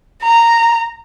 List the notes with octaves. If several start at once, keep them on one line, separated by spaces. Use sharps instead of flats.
A#5